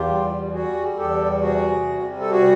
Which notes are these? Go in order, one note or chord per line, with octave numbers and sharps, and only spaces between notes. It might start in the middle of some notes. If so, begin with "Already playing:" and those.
Already playing: E2 F4 G4
G3
G3 F#4 G#4
E2 G4 A4
C3 F#4 G#4
G3
A4
F#4 G#4